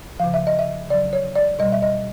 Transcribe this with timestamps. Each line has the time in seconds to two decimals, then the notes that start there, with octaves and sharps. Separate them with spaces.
0.20 C#3 F3 F5
0.34 E5
0.47 D#5
0.59 E5
0.89 C#3 F#3 D5
1.13 C#5
1.36 D5
1.59 B2 G3 D#5
1.72 E5
1.82 D#5